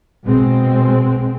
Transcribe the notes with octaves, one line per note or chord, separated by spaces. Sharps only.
B2 G#3 C4